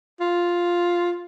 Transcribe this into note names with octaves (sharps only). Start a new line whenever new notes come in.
F4